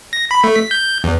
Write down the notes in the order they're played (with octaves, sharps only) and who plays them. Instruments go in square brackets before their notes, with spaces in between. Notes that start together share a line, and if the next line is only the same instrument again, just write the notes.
[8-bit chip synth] A#6
B5
A3
B6
G6
E2